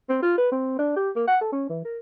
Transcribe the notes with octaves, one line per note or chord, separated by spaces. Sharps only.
C4
F4
B4
C4
D4
G4
A#3
F#5
A4
C#4
E3
A#4